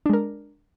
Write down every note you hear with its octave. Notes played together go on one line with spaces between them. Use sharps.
G#3 D4 A#4